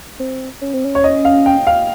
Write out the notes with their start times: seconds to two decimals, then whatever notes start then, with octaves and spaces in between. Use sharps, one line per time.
0.20 C4
0.61 C#4
0.74 C4
0.84 C#4
0.95 C#5
1.04 D#5
1.25 F5
1.46 G5
1.67 F5